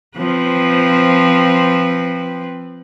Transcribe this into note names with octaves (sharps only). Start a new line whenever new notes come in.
F3 C4 B4